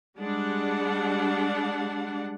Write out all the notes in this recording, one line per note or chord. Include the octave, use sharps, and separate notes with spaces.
G3 G#3 D4 F#5